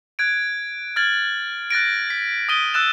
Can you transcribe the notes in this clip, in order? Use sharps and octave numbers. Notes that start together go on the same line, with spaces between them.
F#6 G#6 D7
F6 G#6 A6 F#7
F#6 A6 A#6 D7
B6
D#6 A6 B6 D#7 G7
E6 F#6 A6 E7